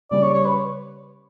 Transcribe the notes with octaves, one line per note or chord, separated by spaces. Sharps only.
C#3 G3 C#4 D5
C#5
C#5
B4